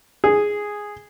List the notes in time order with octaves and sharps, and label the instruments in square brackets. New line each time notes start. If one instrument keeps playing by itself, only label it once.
[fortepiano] G#4